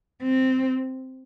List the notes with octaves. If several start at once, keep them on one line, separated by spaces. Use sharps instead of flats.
C4